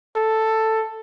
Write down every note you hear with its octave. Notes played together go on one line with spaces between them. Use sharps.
A4